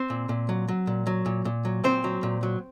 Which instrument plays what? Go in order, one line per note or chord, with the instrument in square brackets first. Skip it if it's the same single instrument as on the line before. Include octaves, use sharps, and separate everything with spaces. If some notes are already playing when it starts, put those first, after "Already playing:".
Already playing: [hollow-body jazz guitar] C4 C5
A#2
A#2
F#3
F#3
A#2
F#3
A#2
A#2
F#3
A#2 C4 C5
F#3
A#2
F#3